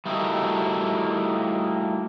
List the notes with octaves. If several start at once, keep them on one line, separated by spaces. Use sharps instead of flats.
G3 A3 A#3 D#4 E4 F#4